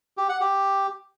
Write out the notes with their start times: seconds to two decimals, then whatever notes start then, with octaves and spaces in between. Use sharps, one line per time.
0.17 G4
0.29 F#5
0.40 G4